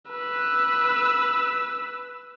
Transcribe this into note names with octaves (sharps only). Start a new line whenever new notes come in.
B4 E6